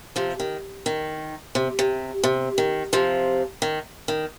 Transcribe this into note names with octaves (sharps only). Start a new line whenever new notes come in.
C3 F3
D#3
D#3
C3
C3
C3
D#3
C3 F3
D#3
D#3